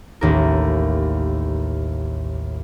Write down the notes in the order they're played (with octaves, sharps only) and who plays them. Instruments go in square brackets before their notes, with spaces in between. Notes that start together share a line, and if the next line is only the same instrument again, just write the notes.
[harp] A1 D#2 A#4